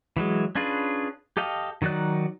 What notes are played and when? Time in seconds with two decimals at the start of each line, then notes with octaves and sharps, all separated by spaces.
0.17 E3 F#3 G#3
0.55 C#4 D4 F4 G#4 B4
1.37 G4 A4 D#5 F5 G5
1.82 D#3 F#3 D#4 D5 F#6